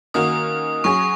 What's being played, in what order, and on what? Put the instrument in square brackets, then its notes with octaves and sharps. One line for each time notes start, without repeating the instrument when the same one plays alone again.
[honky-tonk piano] D#3 A#3 C#4 F#4 A#4 [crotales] D#6
[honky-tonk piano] F#3 C#4 G#4 [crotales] C#6